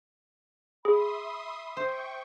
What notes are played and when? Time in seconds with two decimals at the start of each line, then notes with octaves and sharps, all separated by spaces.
0.85 G#4 E5 B5 C6 D#6
1.77 C5 G5 C#6